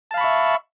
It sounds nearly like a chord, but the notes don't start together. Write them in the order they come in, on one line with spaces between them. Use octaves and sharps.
A5 F5 B5 C#6 E5